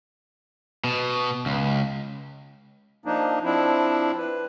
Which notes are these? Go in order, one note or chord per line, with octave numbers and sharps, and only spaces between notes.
B2
C#2
F3 A#3 D4 D#4
F3 C4 D4 E4
B4